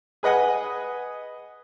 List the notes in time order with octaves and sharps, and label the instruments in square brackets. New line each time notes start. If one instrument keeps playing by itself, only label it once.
[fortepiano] G#4 B4 D#5 F#5 G#5